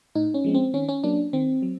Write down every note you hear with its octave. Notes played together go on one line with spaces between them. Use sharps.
A2 D#4
C#4
F3 G#3 C4
C4
D#3 C#4
C#4
F#3 A#3 D4
D#3 C4
F#3